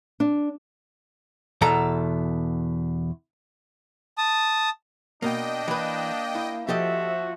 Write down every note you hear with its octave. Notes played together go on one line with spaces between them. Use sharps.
D4
E2 B2 A4 A#5
A5 D#6
B2 A#3 D4 D#5 G5
E3 A#3 B4
E4
F3 F#4 G4 A4 D#5 E5